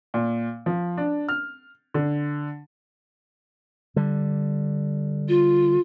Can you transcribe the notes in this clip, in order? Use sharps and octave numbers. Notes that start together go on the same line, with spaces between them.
A#2
F3
D4
F6
D3
D3 G3
F4